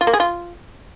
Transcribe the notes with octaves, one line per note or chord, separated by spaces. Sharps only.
F4
A#3
G#4
F4